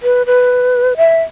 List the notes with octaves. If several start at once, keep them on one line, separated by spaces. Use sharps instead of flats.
B4
B4
E5